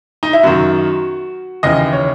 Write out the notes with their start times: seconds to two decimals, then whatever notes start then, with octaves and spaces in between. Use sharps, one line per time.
0.23 D#4
0.33 E4
0.43 F#2 D#3 F#4
1.63 D#2 C#3 E3 D#5
1.93 C#5